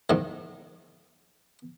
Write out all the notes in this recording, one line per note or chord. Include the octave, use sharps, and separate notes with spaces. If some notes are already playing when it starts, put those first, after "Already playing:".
G#2 D#3